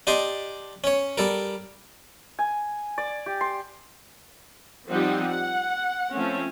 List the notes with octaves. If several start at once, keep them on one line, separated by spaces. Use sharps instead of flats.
D4 G4 D#5 C6
C#4 C#5
G3 A4 A#4
G#5
D5
G4
C6
F3 G3 C4 D#4 G4 F#5
F#5
F3 A3 C4 C#4